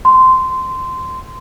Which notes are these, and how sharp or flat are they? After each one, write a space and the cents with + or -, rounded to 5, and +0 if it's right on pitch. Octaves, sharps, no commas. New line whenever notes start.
C6 -15